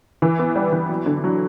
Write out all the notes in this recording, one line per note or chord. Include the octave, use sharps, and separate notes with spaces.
E3
B3
G3
E3
F#3
D3
F#3